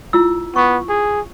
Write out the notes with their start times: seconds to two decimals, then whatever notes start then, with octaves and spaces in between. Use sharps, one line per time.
0.13 E4 F4 E6
0.56 B3 C#6
0.89 G#4